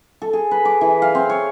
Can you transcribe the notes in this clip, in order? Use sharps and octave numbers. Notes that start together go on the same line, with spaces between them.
A4
G#4
B4
D6
E3
F5
C4
C#5